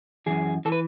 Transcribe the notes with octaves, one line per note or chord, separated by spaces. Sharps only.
F#2 C#3 E3 G#4
E3 A4
B4